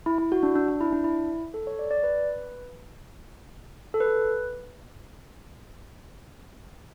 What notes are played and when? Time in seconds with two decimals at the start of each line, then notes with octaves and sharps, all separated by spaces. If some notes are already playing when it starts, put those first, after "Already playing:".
0.06 E4
0.18 E4
0.32 F#4
0.43 D4
0.56 D4
0.68 D4
0.81 E4
0.92 D4
1.04 E4
1.54 A4
1.67 C#5
1.79 D5
1.91 D5
2.03 B4
3.94 A4
4.00 B4